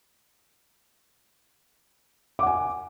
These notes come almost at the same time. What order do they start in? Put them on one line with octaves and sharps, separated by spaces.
D6 F#5 G#5